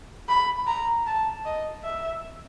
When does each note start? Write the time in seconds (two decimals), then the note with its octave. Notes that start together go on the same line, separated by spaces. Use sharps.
0.29 B5
0.67 A#5
1.07 A5
1.45 D#5
1.83 E5